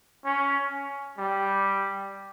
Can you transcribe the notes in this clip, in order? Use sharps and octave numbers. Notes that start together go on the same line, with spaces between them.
C#4
G3